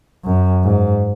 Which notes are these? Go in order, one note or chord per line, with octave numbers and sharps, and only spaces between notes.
F#2
G#2